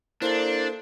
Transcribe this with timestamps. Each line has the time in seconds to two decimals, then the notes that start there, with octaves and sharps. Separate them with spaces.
0.22 A#3 D4 E4 A4 C5